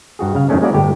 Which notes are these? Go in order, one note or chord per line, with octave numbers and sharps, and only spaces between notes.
G2 F#4 G#4
C#3 F5
F#2 D#3 A3 C#4 D4
G#3 A#3 C#4 E4 F#4 D5
G1 A2 G4